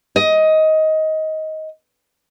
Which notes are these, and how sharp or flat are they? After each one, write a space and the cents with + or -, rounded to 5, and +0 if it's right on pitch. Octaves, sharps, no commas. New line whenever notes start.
D#5 +15